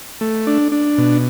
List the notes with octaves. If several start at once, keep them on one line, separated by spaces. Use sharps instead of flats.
A3
D4
D4
B2